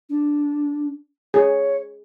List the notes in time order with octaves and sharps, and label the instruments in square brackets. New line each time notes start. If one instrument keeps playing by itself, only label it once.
[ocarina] D4
[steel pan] G#4 [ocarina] C#5